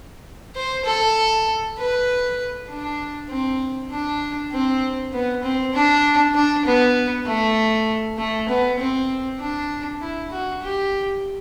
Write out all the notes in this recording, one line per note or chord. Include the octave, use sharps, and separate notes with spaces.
C5
A4
B4
D4
C4
D4
C4
B3
C4
D4
D4
B3
A3
A3
B3
C4
D4
E4
F#4
G4